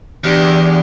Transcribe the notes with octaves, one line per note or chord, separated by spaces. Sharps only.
E2 D4 G4